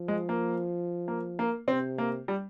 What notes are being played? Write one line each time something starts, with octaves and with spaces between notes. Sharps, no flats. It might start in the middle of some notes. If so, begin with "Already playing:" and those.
Already playing: F3
G#3
A#3
A#3
A#3
C3 C4
A#3
G3